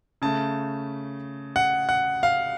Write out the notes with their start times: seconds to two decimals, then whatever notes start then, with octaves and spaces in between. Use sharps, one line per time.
0.22 C#3 A3 A5
1.56 F#5
1.89 F#5
2.23 F5